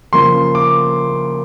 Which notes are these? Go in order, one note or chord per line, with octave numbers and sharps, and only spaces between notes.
C#3 F3 A#3 C6
D6